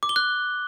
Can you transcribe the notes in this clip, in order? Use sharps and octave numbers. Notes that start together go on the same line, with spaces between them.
D6
G7
F#6